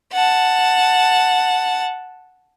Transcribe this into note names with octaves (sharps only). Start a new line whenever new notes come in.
F#5 A5